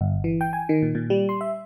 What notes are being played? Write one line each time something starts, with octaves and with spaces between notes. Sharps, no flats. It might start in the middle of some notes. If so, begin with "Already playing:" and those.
G1
E3
G5
G#5
D#3
A#2
A#2
G3
C6
E5